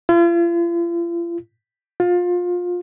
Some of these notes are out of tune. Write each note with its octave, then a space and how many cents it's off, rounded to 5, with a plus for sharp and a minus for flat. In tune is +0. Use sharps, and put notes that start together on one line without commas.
F4 -40
F4 +25